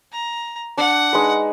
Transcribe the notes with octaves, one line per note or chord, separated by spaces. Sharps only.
A#5
D4 F#5
G#3 D#4 B4